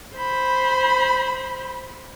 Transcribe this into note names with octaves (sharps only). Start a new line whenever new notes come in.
C5 B5